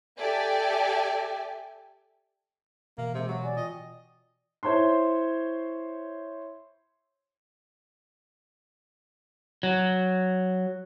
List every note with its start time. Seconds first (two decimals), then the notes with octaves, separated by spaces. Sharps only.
0.18 G4 A4 D5 E5 G5 G#5
2.98 B2 E3 A#3
3.15 C3 G#3
3.29 F#3
3.44 D5 F#5 G#5
3.57 F4 D#5 G5
4.63 E4 C5 C#5 E5 C6
9.63 F#3